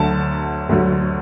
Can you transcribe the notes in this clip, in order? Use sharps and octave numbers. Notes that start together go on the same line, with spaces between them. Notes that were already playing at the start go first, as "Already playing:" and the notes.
Already playing: D2 D3 F#3 A5
D2 D3 F#3